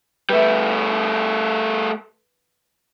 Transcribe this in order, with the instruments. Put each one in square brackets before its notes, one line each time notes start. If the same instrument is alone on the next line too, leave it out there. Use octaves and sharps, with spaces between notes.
[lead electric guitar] G3 A3 [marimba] B4 E5